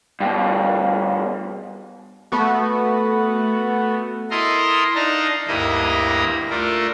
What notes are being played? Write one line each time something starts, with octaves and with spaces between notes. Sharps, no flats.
G2 B2
A3 B3 F#4
E4 A4 A#4 D#5 A#5 C6
D4 D#4 F5 A5 A#5
D2 G2 A#3 E4 D#5 A#5
A3 D4 F4 A4 A#4